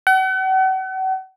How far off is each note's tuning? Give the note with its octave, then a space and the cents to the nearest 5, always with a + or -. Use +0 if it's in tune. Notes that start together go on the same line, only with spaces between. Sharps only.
F#5 +40